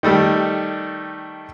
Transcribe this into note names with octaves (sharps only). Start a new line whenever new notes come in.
D#3 G3 A3